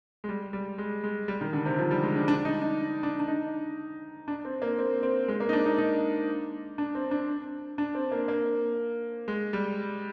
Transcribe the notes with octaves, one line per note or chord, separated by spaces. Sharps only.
G#3
G3
G3
G#3
G#3
G3
D#3
D3
C3
F3
G3
G#3
D4
D4
D#4
D4
D4
D4
D#4
D4
C4
A#3
C4
C4
G#3
A#3
D#4
D4
D#4
D#4
D4
C4
D4
D4
C4
A#3
A#3
G#3
G3